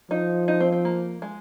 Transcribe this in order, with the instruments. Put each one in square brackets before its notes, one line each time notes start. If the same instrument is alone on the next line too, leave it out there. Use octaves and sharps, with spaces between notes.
[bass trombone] F3 [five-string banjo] D#4
[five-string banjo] D#4
C4
C4
A#3
G#3